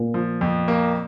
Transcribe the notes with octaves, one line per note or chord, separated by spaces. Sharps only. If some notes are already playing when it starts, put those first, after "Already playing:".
Already playing: A#2
F3
F2
A#3